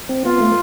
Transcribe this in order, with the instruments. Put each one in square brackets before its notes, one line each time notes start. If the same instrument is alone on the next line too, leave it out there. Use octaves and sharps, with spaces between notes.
[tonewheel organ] C4
[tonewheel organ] B3 [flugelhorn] F4
[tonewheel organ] A3